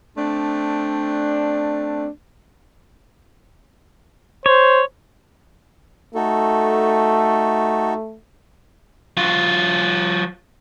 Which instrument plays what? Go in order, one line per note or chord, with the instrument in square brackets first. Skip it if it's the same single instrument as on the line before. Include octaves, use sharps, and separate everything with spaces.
[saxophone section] A3 C4 D4
[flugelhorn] C5 [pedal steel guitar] C#5
[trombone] A3 [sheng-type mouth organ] D#4 F#4 A4
[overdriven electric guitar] F#3 F4